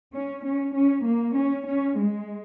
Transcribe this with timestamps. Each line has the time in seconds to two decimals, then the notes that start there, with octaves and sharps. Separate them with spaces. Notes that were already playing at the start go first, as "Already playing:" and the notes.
0.14 C#4
0.45 C#4
0.75 C#4
1.05 A#3
1.36 C#4
1.66 C#4
1.97 G#3